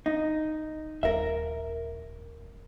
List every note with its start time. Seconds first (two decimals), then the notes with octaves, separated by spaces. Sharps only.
0.06 D#4
1.03 D#1 A#4 E5